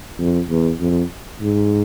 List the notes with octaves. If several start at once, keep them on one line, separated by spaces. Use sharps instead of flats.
F2
E2
F2
G#2